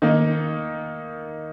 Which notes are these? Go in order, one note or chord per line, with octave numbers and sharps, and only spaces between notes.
D#3 A#3 D#4